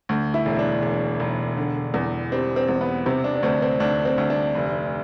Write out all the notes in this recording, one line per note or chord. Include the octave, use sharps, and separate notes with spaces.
D2
E4
E1
D4
E1
E1
D3
E2
G3 C4
C4
E2
B3
C3 C4
D4
D4
D2 C4
C4
D2 D4
C4
D2
D4
F1